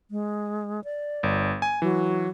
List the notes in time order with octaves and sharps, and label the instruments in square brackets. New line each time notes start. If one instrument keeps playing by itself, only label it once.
[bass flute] G#3
D5
[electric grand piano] G1
G#5
[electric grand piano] E3 [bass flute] F#3